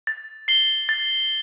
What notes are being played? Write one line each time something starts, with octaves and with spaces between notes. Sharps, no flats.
A6
C7 G7
A6